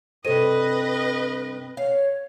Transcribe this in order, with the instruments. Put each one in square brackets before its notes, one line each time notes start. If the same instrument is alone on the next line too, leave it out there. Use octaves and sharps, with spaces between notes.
[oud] G2 C3 [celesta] A4 C5 D#7 [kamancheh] B4 D#5
[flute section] C#5 [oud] F5